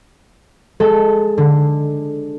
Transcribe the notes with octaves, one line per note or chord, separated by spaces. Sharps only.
G#3 A4
D3